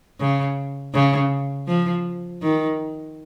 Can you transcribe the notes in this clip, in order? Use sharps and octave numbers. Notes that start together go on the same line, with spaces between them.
C#3
C#3
F3
D#3